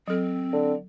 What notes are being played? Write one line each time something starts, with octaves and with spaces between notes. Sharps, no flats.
F#3 C4 A4
D3